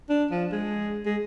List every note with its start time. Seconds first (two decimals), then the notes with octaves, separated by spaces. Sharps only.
0.09 D4
0.31 F3
0.52 G#3
1.05 G#3